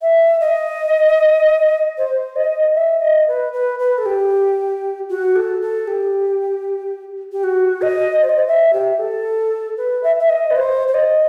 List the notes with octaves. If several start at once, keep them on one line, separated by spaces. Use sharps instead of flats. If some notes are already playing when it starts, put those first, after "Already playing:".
E5
D#5
C5
D#5
E5
D#5
B4
B4
B4
A4
G4
F#4
A4
A4
G4
G4
F#4
D#5
C5
D#5
C5
E5
G4
A4
B4
E5
E5
D#5
B4
C5
C5
D#5